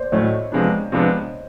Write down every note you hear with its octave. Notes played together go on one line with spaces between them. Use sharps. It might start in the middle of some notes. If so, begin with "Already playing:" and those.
Already playing: C5 D5
A2 F#3 A3 C#4 C#5 D#5
C3 F3 G#3 B3 D4
C3 F3 G#3 B3 D4